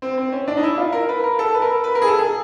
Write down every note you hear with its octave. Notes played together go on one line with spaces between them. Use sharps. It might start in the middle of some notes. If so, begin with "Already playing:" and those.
C4
C4
C#4
D4
D#4
E4
F4
A#4
B4
A#4
A4
B4
A#4
B4
A#4
G#4
A4
G#4